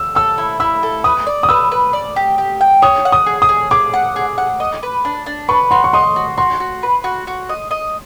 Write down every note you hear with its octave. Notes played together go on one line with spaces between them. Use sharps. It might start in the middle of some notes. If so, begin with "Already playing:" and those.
Already playing: E6
A4 E6
E4
E4 E6
A4
B4 D#6
D5
D#6
B4 E6
B4
D5
G4
G4
G5
C#5 D#6
F#5
D#6
G#4
D#6
G#4
G#4 D6
F#5
G#4
F#5
D#5
B4
D4
D4
B4 C#6
F#4 C6
C#6
D#5 C6
F#4
F#4 C6
F#4
B4
F#4
F#4
D#5
D#5